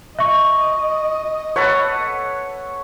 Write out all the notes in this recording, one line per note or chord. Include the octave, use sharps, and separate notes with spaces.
D#5 E5 C#6
A4 B4 C#5 F#5